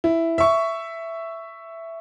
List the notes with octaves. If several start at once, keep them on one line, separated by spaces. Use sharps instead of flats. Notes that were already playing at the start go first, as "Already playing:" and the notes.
E4
E5 C#6